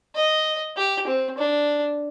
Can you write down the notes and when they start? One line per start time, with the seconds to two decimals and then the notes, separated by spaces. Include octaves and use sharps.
0.15 D#5
0.77 G4
1.07 C4
1.38 D4